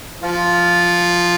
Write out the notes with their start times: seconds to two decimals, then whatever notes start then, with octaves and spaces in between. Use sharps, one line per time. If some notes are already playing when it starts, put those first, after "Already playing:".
0.22 F3 F4